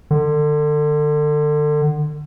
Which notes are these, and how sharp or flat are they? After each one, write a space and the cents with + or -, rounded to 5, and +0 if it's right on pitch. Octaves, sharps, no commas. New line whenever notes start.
D3 +30